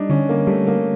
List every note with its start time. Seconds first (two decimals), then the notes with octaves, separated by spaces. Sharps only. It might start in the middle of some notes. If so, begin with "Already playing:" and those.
Already playing: G3 D4 D#4
0.10 D3 C#4
0.29 A#3
0.47 G3 A3
0.67 A#3